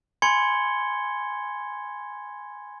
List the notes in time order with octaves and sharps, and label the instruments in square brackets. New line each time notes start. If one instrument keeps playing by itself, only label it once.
[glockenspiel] G#5 B5 C6 G#6 C#7 G7